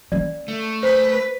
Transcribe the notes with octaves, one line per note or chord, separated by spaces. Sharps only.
A#3 C#4 D5
A3
B4 C5